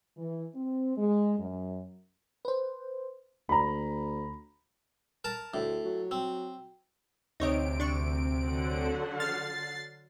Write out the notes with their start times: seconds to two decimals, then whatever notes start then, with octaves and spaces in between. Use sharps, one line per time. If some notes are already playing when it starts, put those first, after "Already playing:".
0.17 E3
0.55 C4
0.97 G#3
1.38 F#2
2.45 B4 C5
3.49 D2 A#5 B5
5.24 A#4 A5
5.54 D2 A2
5.85 F#3
6.11 C4
7.40 D2 C3 D#4 C#5 D#5 D7
7.80 D4 C#6
8.43 D3 F#3 F#5
9.20 F6 A6 C7